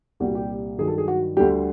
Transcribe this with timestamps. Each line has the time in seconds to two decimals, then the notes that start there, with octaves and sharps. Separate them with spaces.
0.20 C2 A#2 G3 F#4
0.35 G4
0.78 G2 D#3 F#3 G#4
0.88 A4
0.98 G#4
1.08 F#4
1.37 D2 D3 G3 G4